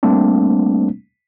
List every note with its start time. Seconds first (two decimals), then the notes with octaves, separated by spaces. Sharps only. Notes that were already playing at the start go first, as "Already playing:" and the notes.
0.03 G3 A3 A#3 C4 D4